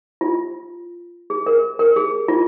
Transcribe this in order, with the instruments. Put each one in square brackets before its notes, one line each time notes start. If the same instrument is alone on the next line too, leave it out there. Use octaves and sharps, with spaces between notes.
[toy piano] F4
G#4
A#4
A#4
G#4
F4